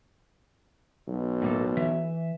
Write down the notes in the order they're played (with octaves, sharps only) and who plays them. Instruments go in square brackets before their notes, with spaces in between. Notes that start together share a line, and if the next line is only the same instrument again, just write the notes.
[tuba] B1
[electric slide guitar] A2 A#3 A4
E3 E5